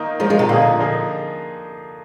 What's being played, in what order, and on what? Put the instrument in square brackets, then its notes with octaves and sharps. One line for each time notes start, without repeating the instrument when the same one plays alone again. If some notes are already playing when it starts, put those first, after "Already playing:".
Already playing: [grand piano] D#3 A#3 D#4
[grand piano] D#3 A#3 D#4 [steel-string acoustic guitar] F3 G#3
[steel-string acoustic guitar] F3 G#3
C3
[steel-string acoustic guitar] A#2 [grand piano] D3 F3 A#3 D#4 G#4
[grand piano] D3 F3 A#3 D#4 G#4